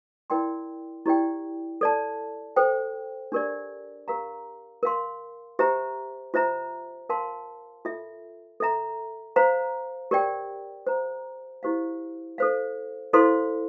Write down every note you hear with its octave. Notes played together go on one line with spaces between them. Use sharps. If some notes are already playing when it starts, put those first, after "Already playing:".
E4 A#4 D5 G5 C6
E4 G4 D5 G5
A4 D5 A5
A4 C5 G5
D4 G4 A#4 D5
G4 A#4 F5 A#5
A#4 F5 C6
G4 C5 E5 A#5
F4 C5 E5 A#5
A#4 F5 A5 C6
F4 A4 E5
A4 E5 A#5
C5 F5 A#5
G4 A#4 D5 G5
C5 F5 A#5
E4 G4 C5 F5
A4 C5 F5
E4 A4 C5 F5 C6